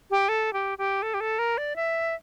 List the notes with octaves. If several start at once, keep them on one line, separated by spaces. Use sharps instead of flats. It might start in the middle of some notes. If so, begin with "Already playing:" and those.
G4
A4
G4
G4
A4
G4
A4
A#4
D5
E5